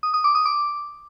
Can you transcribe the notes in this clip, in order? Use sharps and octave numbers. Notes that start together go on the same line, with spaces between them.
D#6
D#6
D6
D#6
D6